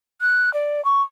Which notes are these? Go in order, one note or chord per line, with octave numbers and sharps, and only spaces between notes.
F#6
D5
C#6